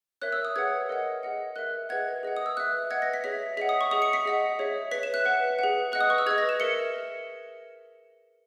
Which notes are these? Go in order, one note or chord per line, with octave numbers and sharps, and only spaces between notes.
A#4 C#5 E5 F#6
E6
D#6
G#4 B4 F#5 G#6
A#4 D#5 F#5
G#4 D#5 F#5
A#4 E5 F#6
G#4 B4 D#5 F#5 G#6
G#4 D#5 F#5
D#6
E6
B4 E5 F#6
B4 D#5 F#5 G#6
A#6
B6
G#4 C#5 E5 B6
G#4 D#5 F#5 B6
D#6
C#6
G#4 D#5 F#5 D#6
C#7
B6
G#4 D#5 F#5
G#4 C#5 E5
B4 E5 B6
E7
F#6
B4 F#5
G#4 B4 F#5
B4 D#5 F#5 F#6
D#6
C#6
E6
G#4 B4 D#5 G#6
A#6
E7
A#4 E5 C#7